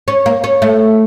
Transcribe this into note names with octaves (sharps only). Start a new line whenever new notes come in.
C#4
A#3
C#4
A3